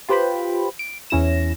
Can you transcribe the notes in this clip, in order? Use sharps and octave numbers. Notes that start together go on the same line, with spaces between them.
F4 G4 B4 C5 G5 B5
D7
E2 C#4 E4 A#6 E7